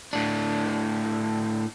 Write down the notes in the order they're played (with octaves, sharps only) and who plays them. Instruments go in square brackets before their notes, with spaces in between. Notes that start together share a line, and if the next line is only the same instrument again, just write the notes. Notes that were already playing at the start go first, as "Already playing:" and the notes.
[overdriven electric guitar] A2 D4